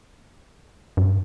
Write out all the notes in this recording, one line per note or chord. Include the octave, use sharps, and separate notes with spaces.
G2